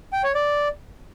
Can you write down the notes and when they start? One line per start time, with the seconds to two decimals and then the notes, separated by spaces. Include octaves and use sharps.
0.13 G5
0.24 C#5
0.35 D5